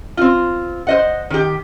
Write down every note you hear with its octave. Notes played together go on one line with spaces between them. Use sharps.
C4 F4
C5 D#5 F#5
D#3 G4